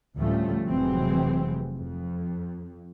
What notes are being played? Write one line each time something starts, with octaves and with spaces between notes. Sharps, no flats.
D2 A2 F3 G3 A3 C#4
F1 C3 E3 F#3 G#3 C4
F2